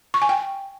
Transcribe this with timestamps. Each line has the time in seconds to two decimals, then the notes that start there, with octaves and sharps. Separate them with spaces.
0.14 C#6
0.22 G#5
0.29 G5